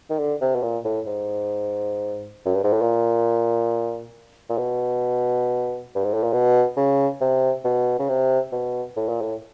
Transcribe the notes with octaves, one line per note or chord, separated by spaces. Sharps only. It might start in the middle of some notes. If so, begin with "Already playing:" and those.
D#3
D3
C3
B2
A#2
A2
G#2
F#2
G2
G#2
A2
A#2
A#2
B2
G2
G#2
A2
A#2
B2
C#3
C3
B2
C#3
C3
B2
A2
A#2
A2